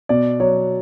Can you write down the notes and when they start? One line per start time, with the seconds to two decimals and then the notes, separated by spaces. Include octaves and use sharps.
0.09 B2 D5
0.40 F#3 C#5